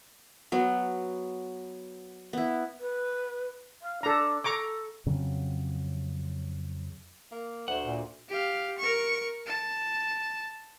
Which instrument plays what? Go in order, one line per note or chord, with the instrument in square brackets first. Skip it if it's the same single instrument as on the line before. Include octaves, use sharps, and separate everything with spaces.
[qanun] F#3 B3
B3 E4
[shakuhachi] B4
F5
[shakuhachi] D4 [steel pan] A4 A#5
[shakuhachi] A4 [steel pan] A#5 C#6 D6
[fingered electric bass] F2 C#3 F#3 C4
[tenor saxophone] A#3
[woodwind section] D2 [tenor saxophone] A3 [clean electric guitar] C5 F#5
[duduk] A#2
[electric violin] G4 F5
A#4 C#6
A5